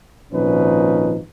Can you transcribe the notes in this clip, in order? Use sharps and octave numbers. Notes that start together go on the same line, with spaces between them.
G#1 A#2 F3 C#4 D#4 B4